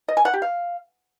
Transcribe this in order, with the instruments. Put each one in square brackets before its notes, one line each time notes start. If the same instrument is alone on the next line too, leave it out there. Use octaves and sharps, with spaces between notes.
[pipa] D#5
G#5
F#5
G4
F5